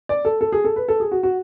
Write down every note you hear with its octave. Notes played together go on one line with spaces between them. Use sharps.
D5
A4
A4
G#4
A4
B4
A4
G#4
F#4
F#4